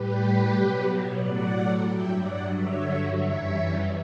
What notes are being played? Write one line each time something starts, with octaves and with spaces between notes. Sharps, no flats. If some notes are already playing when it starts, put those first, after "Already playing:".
Already playing: A2 G3 G4 B4
B2 F#3
A2 F#3 D5 F#5
G2 F#3 E5 G5
D5 F#5
G2 D3 F#3 C#5 E5
F#2 E3 G3 C#5 E5